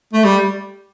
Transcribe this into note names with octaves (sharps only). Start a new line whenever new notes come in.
A3
G3